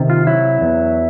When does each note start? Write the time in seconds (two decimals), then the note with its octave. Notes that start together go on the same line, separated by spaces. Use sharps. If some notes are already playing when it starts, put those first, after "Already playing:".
Already playing: C3 D#3
0.10 F4
0.27 F#3 E4
0.61 E2